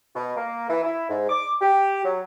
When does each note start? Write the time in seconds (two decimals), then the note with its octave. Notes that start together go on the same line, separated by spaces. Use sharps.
0.16 B2
0.37 A#3
0.69 E3
0.83 E4
1.09 G#2
1.29 D6
1.61 G4
2.05 F#3